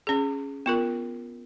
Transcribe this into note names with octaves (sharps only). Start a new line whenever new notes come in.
C#4 G#4
B3 F4 A#4